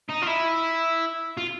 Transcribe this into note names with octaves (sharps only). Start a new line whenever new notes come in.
D#4
F4
E4
F4